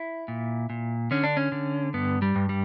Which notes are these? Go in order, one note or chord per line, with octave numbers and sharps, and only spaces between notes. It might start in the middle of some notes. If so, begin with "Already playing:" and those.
Already playing: E4
A#2
A#2
D3 C#4
D4
C#4
D3
G2 B3
G3
G2
G3